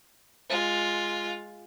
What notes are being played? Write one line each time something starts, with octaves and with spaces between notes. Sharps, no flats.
G#3 F4